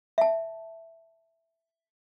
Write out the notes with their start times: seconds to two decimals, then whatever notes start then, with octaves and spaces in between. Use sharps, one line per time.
0.18 E5 A5